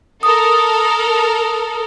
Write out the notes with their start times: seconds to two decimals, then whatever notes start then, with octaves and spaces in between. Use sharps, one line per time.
0.23 A4 A#4 D#6